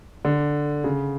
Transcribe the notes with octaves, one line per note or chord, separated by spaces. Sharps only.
D3
C#3